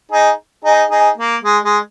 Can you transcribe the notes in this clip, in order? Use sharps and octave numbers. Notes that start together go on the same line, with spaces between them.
D#4 G#4
D#4 G#4
D#4 G#4
A#3
G#3
G#3